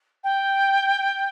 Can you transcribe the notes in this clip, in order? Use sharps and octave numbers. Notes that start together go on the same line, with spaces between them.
G5